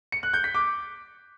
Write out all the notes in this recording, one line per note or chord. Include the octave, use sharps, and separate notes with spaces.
C#7
F#6
G6
B6
D6